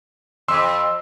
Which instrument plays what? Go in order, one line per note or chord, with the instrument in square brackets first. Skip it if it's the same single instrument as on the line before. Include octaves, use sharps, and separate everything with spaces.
[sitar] F2 [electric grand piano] C6 E6